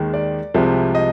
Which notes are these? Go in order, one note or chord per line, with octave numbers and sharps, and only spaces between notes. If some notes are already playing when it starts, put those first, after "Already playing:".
Already playing: D#2 D#3 G#3
D5
C2 C3 F3 G#3
D#5